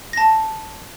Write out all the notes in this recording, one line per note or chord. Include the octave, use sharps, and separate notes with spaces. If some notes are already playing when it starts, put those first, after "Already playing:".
A5 A#6